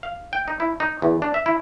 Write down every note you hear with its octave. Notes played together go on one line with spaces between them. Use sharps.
F5
G5
D#4
E4
D#4
E2
D4
E5
E4